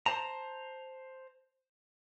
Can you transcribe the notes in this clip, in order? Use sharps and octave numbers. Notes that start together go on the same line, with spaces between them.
C5 A5 A#5